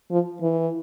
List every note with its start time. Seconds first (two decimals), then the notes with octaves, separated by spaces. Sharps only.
0.11 F3
0.41 E3